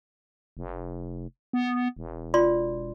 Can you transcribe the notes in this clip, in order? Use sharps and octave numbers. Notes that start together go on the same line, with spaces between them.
F1
B3
E1
F4 D5 C6